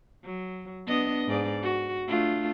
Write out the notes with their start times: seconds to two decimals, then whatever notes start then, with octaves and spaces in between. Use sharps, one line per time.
0.24 F#3
0.87 B3 D4 D#5
1.27 G#2 D5
1.62 F#4
2.08 A3 D4 F4